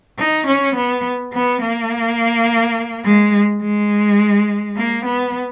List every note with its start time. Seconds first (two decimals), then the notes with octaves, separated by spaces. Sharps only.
0.19 D#4
0.47 C#4
0.76 B3
1.33 B3
1.62 A#3
3.05 G#3
3.62 G#3
4.77 A#3
5.05 B3